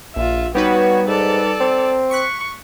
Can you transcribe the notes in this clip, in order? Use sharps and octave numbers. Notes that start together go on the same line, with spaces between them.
A#1 F4 E5
G3 B3 D#4 F#4 B4 C#5
G#2 A4 D5
C4
C#6 F#6 B6 C#7